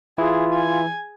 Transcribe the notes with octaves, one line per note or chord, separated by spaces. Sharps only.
E3 E4 F4 G#4
G#5